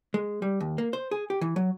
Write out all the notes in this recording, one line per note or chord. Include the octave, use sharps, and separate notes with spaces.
G#3
G3
D#2
A#3
C5
G#4
G4
E3
F#3